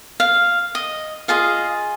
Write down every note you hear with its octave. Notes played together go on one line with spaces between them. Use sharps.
F5
D#5
F4 G#4 D#5 F5